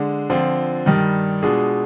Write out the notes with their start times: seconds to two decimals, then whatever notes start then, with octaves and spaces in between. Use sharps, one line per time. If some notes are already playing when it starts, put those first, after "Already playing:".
Already playing: D3 G#3 D4
0.30 D3 F3 C4 F4
0.86 G2 D#3 G3
1.43 B2 G#3 D4 F4 G#4